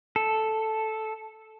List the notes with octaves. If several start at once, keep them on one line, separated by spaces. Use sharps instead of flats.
A4